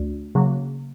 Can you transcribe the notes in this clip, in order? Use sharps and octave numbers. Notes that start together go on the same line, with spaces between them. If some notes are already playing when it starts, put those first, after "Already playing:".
Already playing: D2
C#3 F#3 A#3